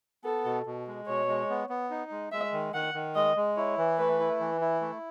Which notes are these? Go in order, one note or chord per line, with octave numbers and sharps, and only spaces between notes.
B3 A4
B2
B2
G#3
B2 C#5
G#3
B3
B3
D#4
G#3
G#3 E5
D#3
D#3 F#5
D#3
G#3 D#5
G#3
E4 C#5
E3
A3 B4
E4
E3
E4
A3